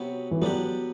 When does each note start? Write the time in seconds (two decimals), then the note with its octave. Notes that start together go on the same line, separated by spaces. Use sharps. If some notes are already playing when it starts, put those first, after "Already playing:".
Already playing: C3 F#3 B3
0.31 E3
0.42 F#3 B3 D4 G4